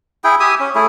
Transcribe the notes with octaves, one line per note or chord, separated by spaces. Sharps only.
E4 G#4 G5
G4 E5 G#5 D#6
C#4
A3 E4 G#4